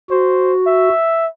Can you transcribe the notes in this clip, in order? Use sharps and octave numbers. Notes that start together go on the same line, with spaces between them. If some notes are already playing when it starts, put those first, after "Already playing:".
F#4 C5
E5